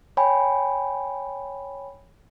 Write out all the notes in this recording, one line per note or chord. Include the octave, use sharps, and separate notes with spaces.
C#5 G5 G#5 B5